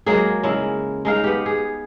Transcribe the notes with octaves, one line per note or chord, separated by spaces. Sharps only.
F#3 G#3 A#3 G#4
C#3 G#3 E4
G#3 D#4 F5
B3 G4
G#4